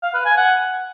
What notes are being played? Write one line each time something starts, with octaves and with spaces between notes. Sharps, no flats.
F5
B4
G#5
F#5